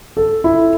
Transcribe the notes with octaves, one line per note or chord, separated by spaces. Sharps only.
A4
E4